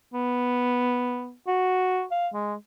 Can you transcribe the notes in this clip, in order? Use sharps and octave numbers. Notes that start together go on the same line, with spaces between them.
B3
F#4
F5
G#3